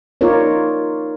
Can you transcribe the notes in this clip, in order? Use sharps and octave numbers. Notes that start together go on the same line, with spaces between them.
D#4 F4 A#4 C#5 D5